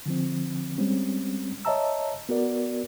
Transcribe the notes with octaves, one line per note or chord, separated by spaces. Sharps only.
D3 F3 C4
G3 G#3 C4 C#4
C#5 D#5 E5 A5 A#5 E6
B3 F#4 A#4 D5